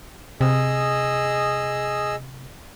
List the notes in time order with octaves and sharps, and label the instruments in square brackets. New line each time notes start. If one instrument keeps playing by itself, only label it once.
[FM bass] C3 [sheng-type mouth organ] G#4 D#5 E6